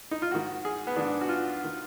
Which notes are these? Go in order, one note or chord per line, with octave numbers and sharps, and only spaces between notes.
D#4
F4
G#2 D#3 F#4
G#4
B3
G#2 D#3 D4
F#4
F4
D#3